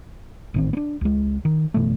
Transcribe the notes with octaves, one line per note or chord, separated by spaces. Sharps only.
A1 D#3 C4
B3 D4
C#2 G#3
D#3
F#1 B2 E3 A3